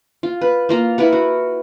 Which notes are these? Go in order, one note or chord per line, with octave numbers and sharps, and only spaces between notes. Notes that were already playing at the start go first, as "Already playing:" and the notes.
F4
B4
A#3 F4 A#5
E4 A#4 B4 F#5
F#4